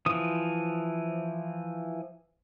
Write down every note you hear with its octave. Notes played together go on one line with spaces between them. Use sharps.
E3 F3 D#6